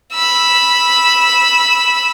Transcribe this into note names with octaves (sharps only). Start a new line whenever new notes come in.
B5 E6